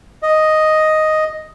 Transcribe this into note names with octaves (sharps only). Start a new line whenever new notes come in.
D#5